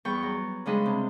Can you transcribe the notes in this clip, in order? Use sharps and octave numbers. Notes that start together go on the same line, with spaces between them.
E2 G3 B3 G5 C#6
F#3
C#3 G3 G#3 D4 D#5 B5
C3